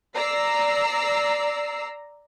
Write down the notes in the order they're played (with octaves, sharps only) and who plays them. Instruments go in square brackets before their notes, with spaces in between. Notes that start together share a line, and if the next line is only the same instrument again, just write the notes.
[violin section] D5 A#5 E6 C7